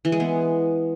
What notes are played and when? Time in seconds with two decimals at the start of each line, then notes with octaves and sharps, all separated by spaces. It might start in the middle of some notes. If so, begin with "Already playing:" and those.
0.05 E3
0.12 G#3
0.20 B3